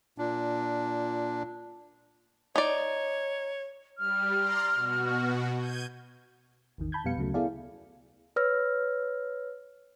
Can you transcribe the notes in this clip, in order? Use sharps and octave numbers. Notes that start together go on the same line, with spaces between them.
A#2 D4
D#4 C#5 D5
G3 F6
D5 A#5 C6
B2 F#4
G6 G#6 D#7
A1 E2 D#3
A5 B5 G6 G#6
F2 B2 G3 B3 F5 C#7
D2 C#3 F#3 A3
B3 E4 G#4 A4 D5 F5
B4 C#5 E6 F6 A#6